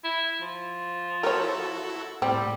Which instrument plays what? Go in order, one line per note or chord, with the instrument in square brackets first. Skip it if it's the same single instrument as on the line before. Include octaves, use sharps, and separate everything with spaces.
[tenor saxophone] E4
F3
[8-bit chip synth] E4 F#4 A4 [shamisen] A#4 C#5
[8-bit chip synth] A2 [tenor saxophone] G3 [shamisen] C4